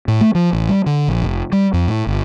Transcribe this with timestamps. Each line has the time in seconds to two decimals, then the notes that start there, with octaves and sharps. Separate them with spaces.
0.08 A2
0.21 A3
0.35 F3
0.53 A1
0.69 G3
0.86 D3
1.08 A#1
1.22 F1
1.52 G3
1.73 F2
1.87 A2
2.07 G1